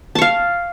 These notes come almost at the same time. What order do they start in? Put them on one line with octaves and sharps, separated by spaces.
A5 C#6 F5